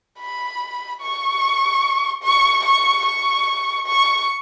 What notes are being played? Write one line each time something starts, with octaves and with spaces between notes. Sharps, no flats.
B5
C#6
C#6
C#6
C#6
C#6